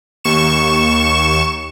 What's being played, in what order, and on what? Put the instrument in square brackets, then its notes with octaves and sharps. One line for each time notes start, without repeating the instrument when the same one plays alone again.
[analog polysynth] D#2 C#6 E7